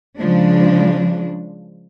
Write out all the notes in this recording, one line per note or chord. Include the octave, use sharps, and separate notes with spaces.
C#3 F3 G#3 D4